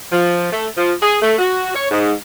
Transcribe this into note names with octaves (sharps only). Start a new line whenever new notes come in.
F3
A3
F3
G#4
A3
F#4
C#5
G#2